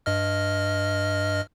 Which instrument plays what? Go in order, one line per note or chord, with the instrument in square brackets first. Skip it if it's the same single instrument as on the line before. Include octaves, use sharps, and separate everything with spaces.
[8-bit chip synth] G2 D#5 F6